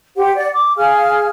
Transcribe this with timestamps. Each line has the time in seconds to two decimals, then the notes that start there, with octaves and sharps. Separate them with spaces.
0.17 G4 C5 F#5
0.35 D5 F#5
0.54 D6
0.77 G#4 F5 G#5 F6